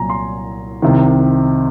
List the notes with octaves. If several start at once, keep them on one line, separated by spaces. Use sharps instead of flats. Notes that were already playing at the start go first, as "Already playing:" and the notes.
Already playing: C2 A#2 F#3 G#5 A#5
C6
C2 C3 D#3